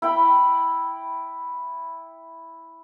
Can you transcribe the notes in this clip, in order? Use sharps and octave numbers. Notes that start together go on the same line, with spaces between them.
E4 G5 B5